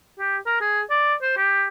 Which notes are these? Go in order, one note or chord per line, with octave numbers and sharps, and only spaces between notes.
G4
A#4
G#4
D5
C5
G4